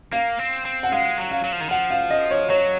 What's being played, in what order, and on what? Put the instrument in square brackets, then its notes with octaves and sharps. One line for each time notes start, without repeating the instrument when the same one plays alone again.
[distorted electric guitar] A#3 [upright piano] F5
[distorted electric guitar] C4
C4
[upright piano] F#5
[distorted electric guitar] G#3 [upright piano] F5
[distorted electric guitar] F#3
[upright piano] F5
[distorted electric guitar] F#3
F3
D#3
[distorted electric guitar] F3 [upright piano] F#5
[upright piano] F5
D#5
C#5
[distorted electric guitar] F#3 [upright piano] C#5